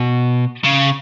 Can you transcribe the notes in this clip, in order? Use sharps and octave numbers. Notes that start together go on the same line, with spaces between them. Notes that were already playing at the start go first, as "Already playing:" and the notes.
Already playing: B2
C#3